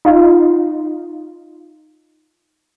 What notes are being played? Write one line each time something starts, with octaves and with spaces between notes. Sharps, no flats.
D#4 F4